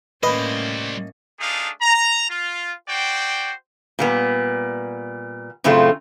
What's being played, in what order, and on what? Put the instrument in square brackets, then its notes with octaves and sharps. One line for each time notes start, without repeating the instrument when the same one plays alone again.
[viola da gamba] A2 A#3 C#4 [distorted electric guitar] G3 C5 [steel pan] B4 [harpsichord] D#5
[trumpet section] A3 D4 D#4 G#4 F5
A#5
F4
F#4 C5 D5 G5
[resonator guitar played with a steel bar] A#2 G3 B3
F#2 A2 C#3 A3 C4 F4